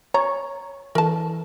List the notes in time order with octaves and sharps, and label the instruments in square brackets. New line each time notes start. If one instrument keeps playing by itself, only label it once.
[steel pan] C#5 [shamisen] A#5
[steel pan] E3 A4 [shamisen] A#4 A5